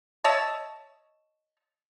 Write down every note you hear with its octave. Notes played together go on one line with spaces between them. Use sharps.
C#5 D#5 E5 A5